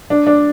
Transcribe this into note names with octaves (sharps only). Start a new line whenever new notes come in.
D4
D4